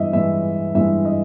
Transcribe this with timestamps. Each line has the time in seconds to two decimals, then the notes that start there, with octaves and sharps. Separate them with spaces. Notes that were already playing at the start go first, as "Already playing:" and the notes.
Already playing: G2 E3 G#3 D#5 E5
0.13 G2 E3 G#3 E5
0.75 G2 E3 G#3 E5
1.05 D#5